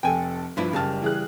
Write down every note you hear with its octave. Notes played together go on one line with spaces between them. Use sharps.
F1 A4 G5 G#5
G2 F3 D4 E4 B4
F#1 C#3 G3 A5 F6
E3 G#4 F#6